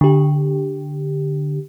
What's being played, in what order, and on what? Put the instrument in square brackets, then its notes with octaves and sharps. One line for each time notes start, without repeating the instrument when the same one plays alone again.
[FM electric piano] D3 G4